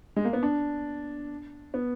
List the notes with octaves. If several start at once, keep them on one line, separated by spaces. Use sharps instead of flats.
G#3
A#3
B3
D4
B3